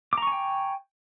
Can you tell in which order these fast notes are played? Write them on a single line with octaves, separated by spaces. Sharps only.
D6 A#5 C#6 G#5 G5